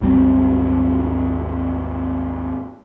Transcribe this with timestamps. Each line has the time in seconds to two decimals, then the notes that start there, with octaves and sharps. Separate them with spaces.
0.01 G#1 D#2 G3 C4